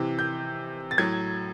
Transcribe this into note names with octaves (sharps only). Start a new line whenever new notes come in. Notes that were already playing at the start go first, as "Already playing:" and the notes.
Already playing: C3 E3
G6
A6
A2 F#3 G#6